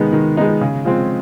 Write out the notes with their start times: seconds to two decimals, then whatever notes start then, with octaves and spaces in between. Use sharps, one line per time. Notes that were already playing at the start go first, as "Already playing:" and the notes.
Already playing: D#3 G#3 B3 D#4
0.13 D#3
0.37 G#3 B3 D#4
0.61 C#3
0.85 F3 G#3 C4